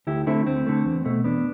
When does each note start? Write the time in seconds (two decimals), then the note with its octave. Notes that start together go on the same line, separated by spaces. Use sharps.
0.07 D2 E4 G4
0.27 D3 A3 C4 E4
0.46 D2 C4
0.66 D3 A3
0.85 E2
1.05 B2 A3
1.24 E2 B3 D4